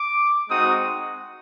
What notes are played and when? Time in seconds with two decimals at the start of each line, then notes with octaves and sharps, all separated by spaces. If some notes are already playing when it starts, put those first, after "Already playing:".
Already playing: D6
0.49 G#3 C4 D#4 F#4 D#6